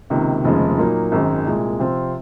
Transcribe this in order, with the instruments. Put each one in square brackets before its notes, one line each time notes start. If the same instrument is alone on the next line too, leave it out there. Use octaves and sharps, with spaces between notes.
[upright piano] C#2 C3 D#3 A#3
F1 D#2 C#3 F3 G#3
A#2 F#3 A#3 D#4
G#1 F#2 D#3 G#3
C2 A#2 G#3
C3 F3 C4 F4